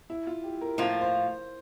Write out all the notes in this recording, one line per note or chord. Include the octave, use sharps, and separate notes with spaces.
E4
F4
G4
A#4
A2 F3 A#3 F4 C5
C5